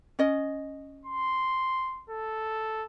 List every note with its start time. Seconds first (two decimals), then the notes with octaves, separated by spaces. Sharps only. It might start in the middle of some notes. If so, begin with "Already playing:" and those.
0.19 C#4 D#5
1.05 C6
2.10 A4